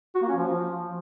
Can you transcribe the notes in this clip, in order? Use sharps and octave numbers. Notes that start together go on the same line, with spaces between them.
F#4
A#3
C#4
F3